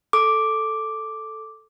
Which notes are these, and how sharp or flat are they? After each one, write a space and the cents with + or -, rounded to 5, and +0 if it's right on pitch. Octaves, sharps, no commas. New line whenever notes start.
A4 +0 D6 +0